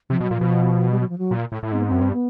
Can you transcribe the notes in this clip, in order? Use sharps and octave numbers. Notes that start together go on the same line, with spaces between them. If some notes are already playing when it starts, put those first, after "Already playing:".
C3 F3
B2 F#3
A#2
F3
B2
G3
F#3
F3
F#3
A#2
A2
A2
G#2 C4
B3
F#2 C4
G2
B3